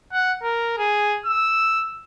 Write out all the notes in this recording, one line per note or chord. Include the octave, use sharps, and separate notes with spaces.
F#5
A#4
G#4
E6